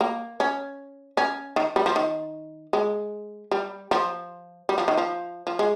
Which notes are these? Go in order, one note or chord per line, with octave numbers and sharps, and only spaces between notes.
A#3
C#4
C#4
D#3
G3
F3
D#3
G#3
G3
F3
G3
F3
D#3
F3
F3
G#3